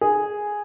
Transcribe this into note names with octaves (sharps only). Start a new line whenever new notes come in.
G#4